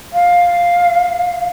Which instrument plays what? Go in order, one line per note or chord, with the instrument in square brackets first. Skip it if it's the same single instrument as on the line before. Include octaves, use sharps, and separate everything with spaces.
[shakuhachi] F5